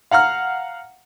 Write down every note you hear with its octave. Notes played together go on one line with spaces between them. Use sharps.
F5 F#5 A#5 F6